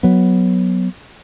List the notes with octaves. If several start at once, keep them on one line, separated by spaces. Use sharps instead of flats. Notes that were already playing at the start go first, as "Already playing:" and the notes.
F#3 B3